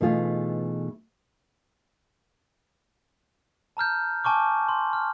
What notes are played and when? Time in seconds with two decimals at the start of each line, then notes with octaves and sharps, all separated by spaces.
0.01 B2 E3 A3 D#4 F4 G#4
3.77 A5 A#5 F6 G6
4.24 G#5 A5 C#6 D6 F6
4.69 C6
4.93 F6